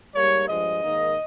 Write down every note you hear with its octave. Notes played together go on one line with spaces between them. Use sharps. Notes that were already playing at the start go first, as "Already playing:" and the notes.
G#2 G3 A#3 C#5
G2 F3 G#3 D#5
G#2 D#3 A#3